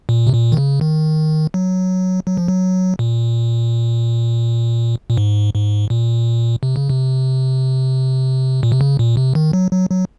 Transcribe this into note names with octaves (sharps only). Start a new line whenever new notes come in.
A#2
C3
A#2
D#3
C#3
D#3
F#3
F#3
F3
F#3
A#2
A#2
G#2
G#2
A#2
C3
C#3
C3
A#2
C3
C#3
A#2
C3
D#3
F#3
F#3
F#3